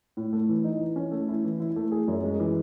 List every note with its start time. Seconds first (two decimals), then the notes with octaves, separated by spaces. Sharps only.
0.17 A2
0.33 A3
0.49 E3
0.64 D#4
0.80 E3
0.96 C#4
1.12 A3
1.28 E4
1.44 E3
1.60 E4
1.76 A3
1.92 G#4
2.08 F#2
2.24 G#3
2.40 E3